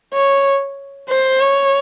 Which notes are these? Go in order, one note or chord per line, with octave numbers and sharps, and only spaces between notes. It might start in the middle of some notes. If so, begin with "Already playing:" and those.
C#5
C5
C#5